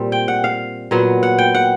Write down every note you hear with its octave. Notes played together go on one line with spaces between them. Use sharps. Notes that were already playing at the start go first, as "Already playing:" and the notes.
Already playing: A#2 G3 C4
G5
F#5
F5
A#2 F#3 B3
F#5
G5
F#5